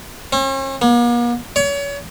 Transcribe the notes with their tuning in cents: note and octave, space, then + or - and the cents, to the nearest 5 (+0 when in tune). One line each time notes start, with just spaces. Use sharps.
C#4 -45
A#3 +45
C#5 +35